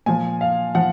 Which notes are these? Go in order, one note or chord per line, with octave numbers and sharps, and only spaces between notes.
A#2 F3 G#5
F5
F3 F#5